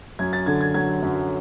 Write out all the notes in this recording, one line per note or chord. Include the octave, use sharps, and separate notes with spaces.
F#2 G#6
A6
D3 G#6
G#6
F#3 G#6
F#2